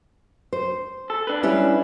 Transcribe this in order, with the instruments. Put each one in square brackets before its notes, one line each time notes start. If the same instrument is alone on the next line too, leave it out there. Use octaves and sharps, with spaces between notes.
[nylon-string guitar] C5
[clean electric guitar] A4
D4 B4
[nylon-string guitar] G3 C#4 E4